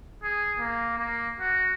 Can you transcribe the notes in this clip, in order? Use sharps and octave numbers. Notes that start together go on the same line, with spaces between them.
G#4
A#3
A#3
F#4